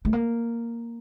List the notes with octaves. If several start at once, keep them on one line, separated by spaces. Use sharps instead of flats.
A3
A#3